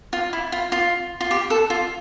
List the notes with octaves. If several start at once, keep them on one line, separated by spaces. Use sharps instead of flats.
F4
E4
F4
F4
F4
G4
A4
F4